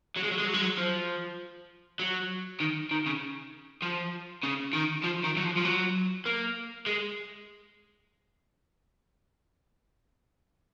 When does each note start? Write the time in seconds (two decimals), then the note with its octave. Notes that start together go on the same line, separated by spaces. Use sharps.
0.17 F#3
0.24 G#3
0.32 F#3
0.39 G#3
0.47 F#3
0.54 G#3
0.62 F#3
0.78 F3
1.99 F#3
2.60 D#3
2.91 D#3
3.06 C#3
3.82 F3
4.43 C#3
4.73 D#3
5.04 F3
5.24 D#3
5.37 F#3
5.44 F3
5.57 F3
5.65 F#3
6.26 A#3
6.87 G#3